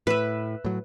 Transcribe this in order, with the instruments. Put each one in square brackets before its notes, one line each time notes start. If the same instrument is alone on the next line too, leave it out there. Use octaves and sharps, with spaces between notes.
[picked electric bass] A2 [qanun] B4 E5
[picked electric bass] A2 F#3